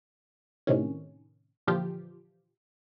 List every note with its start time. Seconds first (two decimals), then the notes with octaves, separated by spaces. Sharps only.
0.67 A2 C3 D#3 C#4
1.67 A#2 D3 E3 F3 F4 G4